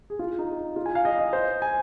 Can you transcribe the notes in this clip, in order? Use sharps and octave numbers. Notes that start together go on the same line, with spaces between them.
G#4
F4
D#4
F4
G#5
F5
D#5
D#5
C5
G#5